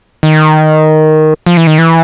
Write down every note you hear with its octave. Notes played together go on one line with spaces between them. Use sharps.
D#3
F3
E3
D#3
E3